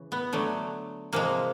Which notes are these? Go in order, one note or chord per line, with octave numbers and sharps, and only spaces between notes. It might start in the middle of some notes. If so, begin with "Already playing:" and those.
Already playing: C#3 E3
B3
D3 F#3 A3
C3 F3 G#3 A#3